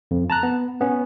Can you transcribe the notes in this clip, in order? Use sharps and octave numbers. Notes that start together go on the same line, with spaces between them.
F2
A5 A#5 F#6
B3
B3 C#4